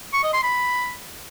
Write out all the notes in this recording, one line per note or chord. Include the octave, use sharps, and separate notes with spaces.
C#6
D#5
C6
B5